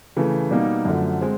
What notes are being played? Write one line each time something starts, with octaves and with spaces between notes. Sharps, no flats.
C#3 E3 A3
B2 G3 A#3 D#4
F#2 D3 F3 A3
G#3 C4